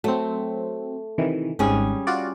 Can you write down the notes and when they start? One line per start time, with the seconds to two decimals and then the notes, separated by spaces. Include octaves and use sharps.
0.04 F#3 A3 C4
1.18 C3 D#3 E3
1.59 G#1 G#2 G3 C#4 G#4
2.07 F4 F#4 D5